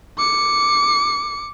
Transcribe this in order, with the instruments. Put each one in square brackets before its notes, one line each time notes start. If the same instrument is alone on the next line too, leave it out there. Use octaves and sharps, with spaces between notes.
[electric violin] D6 C#7